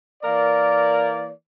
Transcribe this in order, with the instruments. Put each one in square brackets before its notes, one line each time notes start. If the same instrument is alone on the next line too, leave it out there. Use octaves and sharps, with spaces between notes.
[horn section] E3 A#3 A#4 D5